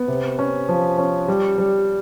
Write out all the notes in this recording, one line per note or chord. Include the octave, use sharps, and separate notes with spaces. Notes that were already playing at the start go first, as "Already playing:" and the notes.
Already playing: B3
C3
C#4
F3
C#4
G3
G3